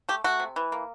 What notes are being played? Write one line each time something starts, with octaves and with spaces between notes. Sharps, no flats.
A3 G4
A3 F#4
C3
E3
A#3